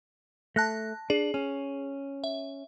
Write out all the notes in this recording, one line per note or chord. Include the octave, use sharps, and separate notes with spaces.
A3 A5 F#6 A#6
D4 G#4
C#4
E5